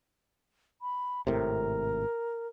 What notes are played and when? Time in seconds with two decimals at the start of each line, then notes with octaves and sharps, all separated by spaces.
0.82 B5
1.27 G#1 A2 C3 A#4